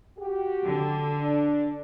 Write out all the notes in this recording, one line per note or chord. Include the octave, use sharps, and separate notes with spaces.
F#4 G4
D3
D4